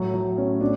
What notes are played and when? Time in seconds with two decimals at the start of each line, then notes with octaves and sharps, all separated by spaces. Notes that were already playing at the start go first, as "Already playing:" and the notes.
Already playing: A2 F#3
0.14 F#3
0.38 C#4
0.61 D4